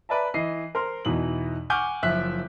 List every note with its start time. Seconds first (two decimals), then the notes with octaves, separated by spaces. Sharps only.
0.09 B4 D5 E5 A5 A#5
0.34 E3 D#5 C7
0.75 A#4 C5 C6
1.05 E2 B2 E3 D#4 F#7
1.70 F#5 G#5 C#6 D6 F6 G6
2.03 F#1 F3 E5 F#6 B6